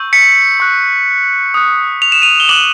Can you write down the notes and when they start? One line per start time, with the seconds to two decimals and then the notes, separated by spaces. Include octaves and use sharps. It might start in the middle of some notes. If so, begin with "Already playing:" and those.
Already playing: C#6 E6 G6
0.13 B6 C#7
0.60 C#6 F#6
1.54 D#6 F#6
2.02 F7
2.12 E7
2.22 D#7 F7
2.40 G7
2.49 D6 F#6 E7 F#7